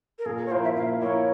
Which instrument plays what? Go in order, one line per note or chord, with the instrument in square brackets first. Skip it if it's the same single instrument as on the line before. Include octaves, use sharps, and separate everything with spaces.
[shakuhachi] A#4
[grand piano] A#2 [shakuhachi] G#4
[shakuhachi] A#4
C#5
[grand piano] F3 A#3 E4 A#4 [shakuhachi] C5
[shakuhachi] E5
[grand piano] A#2 [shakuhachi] F5
[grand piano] F3 A#3 E4 A#4 [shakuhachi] C#5